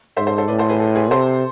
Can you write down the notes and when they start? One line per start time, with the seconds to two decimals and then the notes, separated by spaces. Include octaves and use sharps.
0.17 G#2 C5 E5
0.27 A4 C5
0.38 A4 C5
0.48 A2 B4 D5
0.59 A4 C5
0.69 G#4 B4
0.80 A4
0.95 G#4 B4
1.11 C3 A4 C5